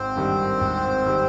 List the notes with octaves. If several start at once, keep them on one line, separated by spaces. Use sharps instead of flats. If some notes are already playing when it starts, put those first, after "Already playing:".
Already playing: G#1 C4 C5
G2 D#3 G3
G#1
D#3 G3